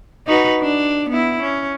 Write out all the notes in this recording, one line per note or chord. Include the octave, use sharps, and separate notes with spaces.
D#4 F#4 B4
D4
B3 E4
C#4